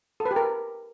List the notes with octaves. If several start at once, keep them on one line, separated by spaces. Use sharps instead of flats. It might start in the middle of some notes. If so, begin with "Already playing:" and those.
A4
B4
G4
A#4